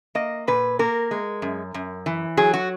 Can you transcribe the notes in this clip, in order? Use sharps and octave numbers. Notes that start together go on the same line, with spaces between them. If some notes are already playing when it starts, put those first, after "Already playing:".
A#3 D#5
A#2 B4
A#3 A#4
G#3
F#2
F#2
E3
F#3 G#4
F#4